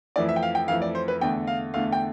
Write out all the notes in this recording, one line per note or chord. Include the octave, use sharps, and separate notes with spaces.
F2 E3 A3 D5
E5
G5
F5
G5
F2 E3 A3 F5
D5
C5
B4
E2 D3 A3 G5
F5
E2 D3 A3 F5
G5